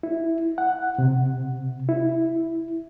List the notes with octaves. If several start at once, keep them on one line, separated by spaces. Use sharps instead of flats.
E4
F#5
C3
E4